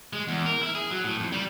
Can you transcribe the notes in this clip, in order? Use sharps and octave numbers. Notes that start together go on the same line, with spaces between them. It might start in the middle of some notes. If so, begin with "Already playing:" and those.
G#3
E2
A#4
E4
G#4
F#3
A2
F2
G3